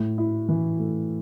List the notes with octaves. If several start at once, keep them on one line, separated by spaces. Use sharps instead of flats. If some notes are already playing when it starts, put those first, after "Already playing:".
Already playing: A2
E4
E3
A3